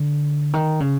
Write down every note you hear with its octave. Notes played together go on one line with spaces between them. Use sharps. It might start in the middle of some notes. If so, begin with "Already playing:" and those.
Already playing: D3
D#3
C#3